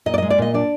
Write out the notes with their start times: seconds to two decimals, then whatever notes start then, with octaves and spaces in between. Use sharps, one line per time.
0.06 A#2 D#5
0.14 D5
0.18 G#3 D#5
0.30 D5
0.38 A#2 D#5
0.54 D4 D5